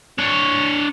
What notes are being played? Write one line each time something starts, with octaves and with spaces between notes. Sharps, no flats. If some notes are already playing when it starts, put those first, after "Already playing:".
D4 C#5